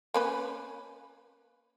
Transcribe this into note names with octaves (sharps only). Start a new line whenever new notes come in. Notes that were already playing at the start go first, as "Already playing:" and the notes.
A#3 C#4 B4